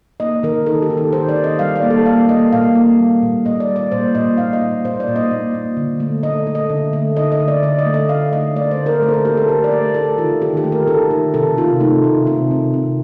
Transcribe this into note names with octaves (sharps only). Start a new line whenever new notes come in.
A#3 D#5
D#3 A#4
D#3 A4
G4
D#3
A4
D#3 C5
D5
D#3
D#5
G3 F5
D5
A#3
A4
A#3 F5
A#3 D#5
A#2 F5
A#3
G3
A#2
A#2 D#5
D5
G3
D5
A#2 C5
A#2 D#5
A#2 F5
D#5
A#2
A#2 C5
D5
A#2
D#5
A#2
A#2
D3
A3
A3 D#5
A3
D#5
D3
A3
D3 D#5
D#5
D3
D5
D3 D5
D#5
A3
D#5
D3 F5
A3 D#5
A3 D5
C5
D3
A#4
A3 A4
C5
A#4
A3 G4
A4
A3 A#4
D5
A3
A3 A4
D#3 F4
D#3 G4
G4
A3
A#4
D#3 A4
D#3
C3 A4
C3 F4
A3 D#4
C3
C3 C4
C3
C3